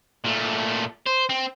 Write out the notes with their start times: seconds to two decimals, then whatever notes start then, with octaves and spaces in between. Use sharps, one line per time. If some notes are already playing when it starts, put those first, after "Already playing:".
0.24 A#2 A3
1.06 C5
1.29 C4